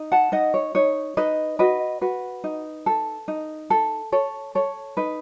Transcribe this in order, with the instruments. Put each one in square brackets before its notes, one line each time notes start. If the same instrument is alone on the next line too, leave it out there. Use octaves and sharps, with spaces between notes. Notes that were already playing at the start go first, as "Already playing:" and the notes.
Already playing: [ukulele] D#4
F#5 A5
D#4 D#5 F#5
C#5
D#4 C#5
D#4 B4 D#5
F#4 B4 D#5
F#4 B4
D#4
A4
D#4
A4
A4 C#5
A4 C#5
D#4 B4